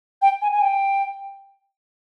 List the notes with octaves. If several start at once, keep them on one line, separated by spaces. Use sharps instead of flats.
G5
G#5
G#5
G5